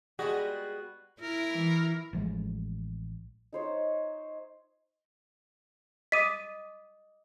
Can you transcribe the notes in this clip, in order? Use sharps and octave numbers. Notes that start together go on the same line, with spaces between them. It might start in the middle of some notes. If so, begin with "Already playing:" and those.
G3 G#3 B3 F#4 G#4
E4 A#4
E3
A1 F3 G#3
D#4 C5 C#5
D#5 D6 D#6 B6 D#7